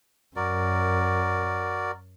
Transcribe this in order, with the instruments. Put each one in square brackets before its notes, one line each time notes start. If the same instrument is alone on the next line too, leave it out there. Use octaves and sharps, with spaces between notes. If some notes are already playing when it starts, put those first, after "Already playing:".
[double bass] F#2 [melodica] F#4 A#4 D5